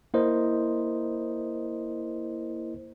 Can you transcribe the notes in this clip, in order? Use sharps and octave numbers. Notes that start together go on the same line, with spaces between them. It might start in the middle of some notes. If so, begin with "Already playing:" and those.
A#3 E4 A#4 C5 D#5